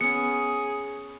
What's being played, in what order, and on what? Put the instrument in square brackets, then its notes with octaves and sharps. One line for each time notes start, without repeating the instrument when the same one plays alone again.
[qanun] B3 C#4 [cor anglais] G#4 [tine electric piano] C#7